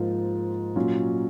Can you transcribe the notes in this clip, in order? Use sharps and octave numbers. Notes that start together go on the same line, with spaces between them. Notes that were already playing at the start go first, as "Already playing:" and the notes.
Already playing: G#2 F3 A#3 F4
A#2 F#3 C#4 F4